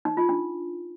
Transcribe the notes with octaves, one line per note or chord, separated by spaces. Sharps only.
D#4
F4
D4